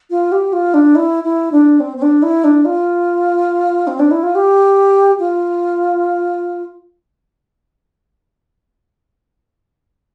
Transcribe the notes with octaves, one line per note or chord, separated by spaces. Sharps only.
F4
G4
F4
D4
E4
E4
D4
C4
C4
D4
E4
D4
F4
C4
D4
E4
F4
G4
F4